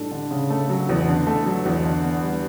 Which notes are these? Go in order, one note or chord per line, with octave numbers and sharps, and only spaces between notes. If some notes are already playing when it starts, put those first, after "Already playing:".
Already playing: A2 G3 D4 A4
D3
C#3
A3
F#3
E2
D3
A3
F#3
E2
D3
B3
G3